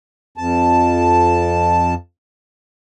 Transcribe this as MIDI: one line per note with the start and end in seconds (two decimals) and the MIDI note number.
0.37 1.94 41
0.37 1.94 81